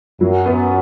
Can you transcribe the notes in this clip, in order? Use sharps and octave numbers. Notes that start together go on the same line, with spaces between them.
F#2 F#3
B3